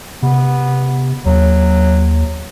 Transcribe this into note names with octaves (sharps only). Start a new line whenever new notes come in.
C3 B3
D#2 F#3